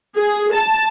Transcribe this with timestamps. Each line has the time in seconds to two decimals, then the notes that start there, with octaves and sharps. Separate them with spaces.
0.18 G#4
0.55 A5